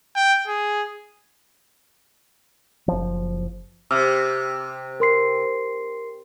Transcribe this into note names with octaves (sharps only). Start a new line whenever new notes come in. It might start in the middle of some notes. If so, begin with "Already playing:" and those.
G5
G#4
F#1 F3
C3 D6 E6 F6
A#4 C6 C7